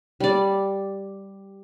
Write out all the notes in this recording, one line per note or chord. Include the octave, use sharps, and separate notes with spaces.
G3 D5